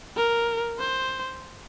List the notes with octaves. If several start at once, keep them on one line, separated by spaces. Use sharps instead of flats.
A#4
C5